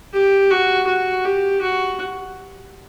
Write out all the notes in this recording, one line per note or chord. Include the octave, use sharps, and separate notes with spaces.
G4
F#4
F#4
G4
F#4